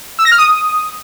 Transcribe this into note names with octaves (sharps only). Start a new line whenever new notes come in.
E6
A#6
F6
D#6